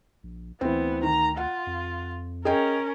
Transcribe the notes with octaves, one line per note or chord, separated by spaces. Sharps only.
A#1
D2 E3 B3 C4
D#3 A#5
F4 F#5
F2
C#4 G#4 A#4 D#5 G5